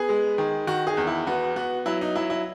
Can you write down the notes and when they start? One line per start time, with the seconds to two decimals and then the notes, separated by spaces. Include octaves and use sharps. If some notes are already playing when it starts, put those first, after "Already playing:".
Already playing: B3 G#4
0.09 G#3
0.38 D#3
0.67 D#3 F#4
0.87 G#4
0.97 E2
1.07 E4
1.27 B3 F#4
1.56 B3 F#4
1.86 F#3 E4
2.01 D#4
2.15 F#3 E4
2.30 E4